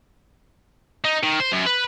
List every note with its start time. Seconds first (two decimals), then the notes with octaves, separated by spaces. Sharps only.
1.04 D#4
1.23 D#3
1.40 C5
1.52 F#2
1.66 B4